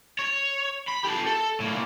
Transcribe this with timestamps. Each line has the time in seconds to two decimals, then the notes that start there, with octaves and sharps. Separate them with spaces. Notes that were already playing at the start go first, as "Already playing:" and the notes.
0.19 C#5
0.88 B5
1.04 G4 A4
1.26 A4
1.60 A2 A#3